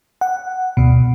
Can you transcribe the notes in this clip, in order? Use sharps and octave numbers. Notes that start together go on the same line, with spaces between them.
F#5
D2 B2